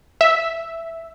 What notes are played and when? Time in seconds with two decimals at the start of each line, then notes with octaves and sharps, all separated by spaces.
0.21 E5